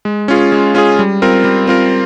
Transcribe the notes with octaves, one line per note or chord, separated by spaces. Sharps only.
G#3
C#4 F4 G#4
G#3
C#4 F4 G#4
G3
C4 F4 A#4
G3
C4 F4 A#4